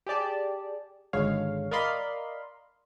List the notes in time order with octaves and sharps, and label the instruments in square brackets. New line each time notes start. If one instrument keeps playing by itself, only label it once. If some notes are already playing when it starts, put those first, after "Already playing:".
[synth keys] G4 G#4 D5 A5
G#1 D3 G#3 C#5 F5
A#4 D5 D#5 F5 B5 C6